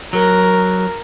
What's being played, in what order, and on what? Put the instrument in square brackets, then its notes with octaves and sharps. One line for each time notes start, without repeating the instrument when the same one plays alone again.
[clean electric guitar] F#3 [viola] A#4